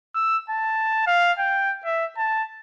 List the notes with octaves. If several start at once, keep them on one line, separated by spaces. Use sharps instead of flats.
E6
A5
F5
G5
E5
A5